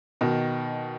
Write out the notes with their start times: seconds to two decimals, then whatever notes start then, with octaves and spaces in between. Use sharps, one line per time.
0.21 B2 D#3